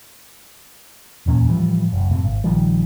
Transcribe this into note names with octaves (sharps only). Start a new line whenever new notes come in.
D#1 E2 A#2 C#4
A2 E3 F3 G3
F#1 C2
F#2 A2 C3
G#1
A#1 D#3 F3 G3